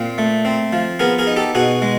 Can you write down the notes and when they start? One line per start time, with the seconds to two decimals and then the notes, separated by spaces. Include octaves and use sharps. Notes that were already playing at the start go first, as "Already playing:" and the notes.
Already playing: A#2 C4
0.18 A3
0.45 C4
0.73 F3
0.99 B3 G#4 A#4
1.18 G#4 A#4
1.27 D#4
1.36 G4 A4
1.55 B2 F#4 G#4
1.82 G#3